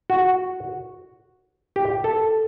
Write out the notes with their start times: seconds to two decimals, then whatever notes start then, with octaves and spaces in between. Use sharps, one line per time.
0.10 F#4
1.76 G4
2.04 A4